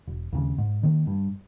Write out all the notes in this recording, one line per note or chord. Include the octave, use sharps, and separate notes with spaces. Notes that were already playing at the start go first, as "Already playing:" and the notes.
E1
D#2 C#3
G#2
D#3 A#3
G2